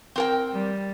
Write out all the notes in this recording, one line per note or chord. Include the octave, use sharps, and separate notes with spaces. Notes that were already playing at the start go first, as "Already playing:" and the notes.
C4 A#4 G5
G3